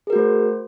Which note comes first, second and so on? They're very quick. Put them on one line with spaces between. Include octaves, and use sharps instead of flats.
G#4 A#4 F#4 A3 C5